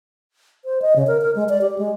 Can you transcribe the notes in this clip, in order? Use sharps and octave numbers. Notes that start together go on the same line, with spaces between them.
C5
D#5
C#3
A#4
A#4
G#3
D5
G4
G#3